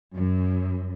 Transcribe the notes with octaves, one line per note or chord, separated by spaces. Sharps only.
F#2